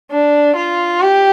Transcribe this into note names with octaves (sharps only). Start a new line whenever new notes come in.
D4
F4
G4